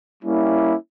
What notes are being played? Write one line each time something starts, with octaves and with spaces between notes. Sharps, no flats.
G3 A#3 C#4 E4